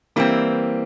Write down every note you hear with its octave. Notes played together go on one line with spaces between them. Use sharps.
E3 G3 A#3 C4